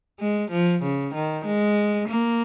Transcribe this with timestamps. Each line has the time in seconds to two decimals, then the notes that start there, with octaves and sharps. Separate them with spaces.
0.20 G#3
0.51 F3
0.82 C#3
1.14 D#3
1.45 G#3
2.08 A#3